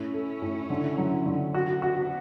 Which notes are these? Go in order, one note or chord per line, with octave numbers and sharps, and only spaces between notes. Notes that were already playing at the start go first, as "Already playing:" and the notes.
Already playing: A2 C#4 E4
A3
A2
D3
F#3
D3
B3 D4 F#4
F#4